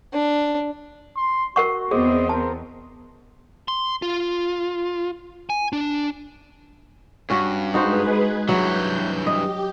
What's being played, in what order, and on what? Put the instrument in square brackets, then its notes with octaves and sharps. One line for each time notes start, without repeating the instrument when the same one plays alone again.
[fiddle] D4
[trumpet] C6
[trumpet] F#4 [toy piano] A#4 F#5 C#6
[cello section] E2 B3 C4 [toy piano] G#4 [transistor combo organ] C5 D#5
[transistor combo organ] A#4 [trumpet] C5 [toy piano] A5
[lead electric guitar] C6
F4
G#5
D4
[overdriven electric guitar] G2 [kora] C#4 F#4
[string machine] G#3 G#4 B4 [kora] D#4 F#4 C5
[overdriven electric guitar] G2 E3 [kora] F#3 [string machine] G6
[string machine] G4 [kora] D#5